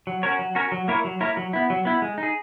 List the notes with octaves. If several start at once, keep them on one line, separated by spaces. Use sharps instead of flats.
F#3
C#4 F#4 A#4 C#5
F#3
C#4 F#4 A#4 C#5
F#3
A#3 E4 A#4 C#5
F#3
A#3 E4 A#4 C#5
F#3
B3 E4
F#3
B3 E4
G#3
D#4
G#4